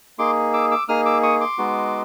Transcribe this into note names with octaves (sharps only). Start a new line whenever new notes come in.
A#3 D#4 G#4 C6 D6
D6 E6
D6 E6
A#3 D#4 G#4 D#6 F6
D6 E6
C#6 D#6
C6 D6
G#3 B3 D#4 F#4